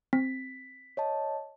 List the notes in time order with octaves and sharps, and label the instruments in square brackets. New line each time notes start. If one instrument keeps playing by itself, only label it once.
[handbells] C4 [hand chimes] B6
[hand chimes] C#5 D#5 A5